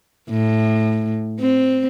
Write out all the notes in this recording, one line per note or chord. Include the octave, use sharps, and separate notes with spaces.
A2
C4